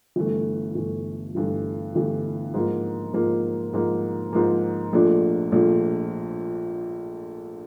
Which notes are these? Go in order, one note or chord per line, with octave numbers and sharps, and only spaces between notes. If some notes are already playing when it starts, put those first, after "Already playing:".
G1 G2 E3 A3
G1 G2 E3 A3
G1 G2 E3 A3
G1 G2 E3 A3
G#2 F3 A#3
G#2 F3 A#3
G#2 F3 A#3
G#2 F3 A#3
A#1 A#2 F3 A3 D4
A#1 A#2 F3 A3 D4